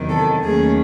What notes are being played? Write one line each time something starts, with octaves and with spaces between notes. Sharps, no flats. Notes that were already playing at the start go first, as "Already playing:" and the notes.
Already playing: E2 C3 D#3 F#3
A4
D#2 D#3 F#3 A3 C#4 G#4